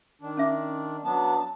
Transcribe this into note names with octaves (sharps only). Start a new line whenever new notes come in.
D#3 D4
C#4 E5 D6
F#3 B3 D4 A5